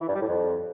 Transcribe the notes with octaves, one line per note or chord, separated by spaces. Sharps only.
E3
G2
G3
A2
F2